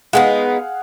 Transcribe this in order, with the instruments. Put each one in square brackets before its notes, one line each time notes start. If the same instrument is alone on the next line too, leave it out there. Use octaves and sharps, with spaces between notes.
[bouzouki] G#3 B3 D#4 [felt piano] G#4 F5 F#5